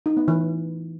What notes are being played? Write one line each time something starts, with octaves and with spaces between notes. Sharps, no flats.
D#4
B3
E3